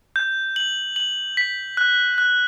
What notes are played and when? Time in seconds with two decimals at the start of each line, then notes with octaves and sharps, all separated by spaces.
0.16 G6
0.56 F#7
0.96 F#7
1.37 B6
1.77 F#6
2.18 F#6